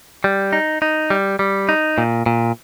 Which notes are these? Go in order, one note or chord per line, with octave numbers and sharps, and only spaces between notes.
G3
D#4
D#4
G3
G3
D#4
A#2
A#2